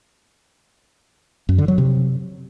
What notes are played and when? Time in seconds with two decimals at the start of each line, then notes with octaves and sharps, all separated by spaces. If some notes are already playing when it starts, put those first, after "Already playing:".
1.49 F#2
1.58 D3
1.68 F#3
1.78 C3